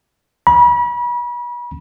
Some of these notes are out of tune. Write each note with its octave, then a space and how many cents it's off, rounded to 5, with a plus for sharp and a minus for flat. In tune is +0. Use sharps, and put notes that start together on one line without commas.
B5 -35